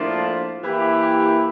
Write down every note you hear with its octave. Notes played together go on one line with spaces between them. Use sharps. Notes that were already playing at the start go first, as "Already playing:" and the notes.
Already playing: A2 F3 A#3 D4 F4
E3 A#3 E4 G4